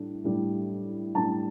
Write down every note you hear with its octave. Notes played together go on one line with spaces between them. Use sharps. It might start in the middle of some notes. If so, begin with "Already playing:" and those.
Already playing: A2 G3 D4
A2 G3 D4
A2 G3 D4 A5